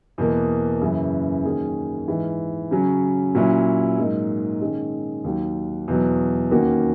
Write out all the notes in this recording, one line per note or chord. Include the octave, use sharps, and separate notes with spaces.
E2 B2 A#3
F#2 C#3 E3
D#3 F#3 A#3 C#4 G#4
G#2 E3 G#3
C#3 F#3 C#4
A#2 F#3 C#4 E4
G#2 F#3 A#3 D#4
D#3 G#3 C#4
D#2 D#3 F#3
E2 B2 F#3
D#2 D#3 A#3 C#4 F#4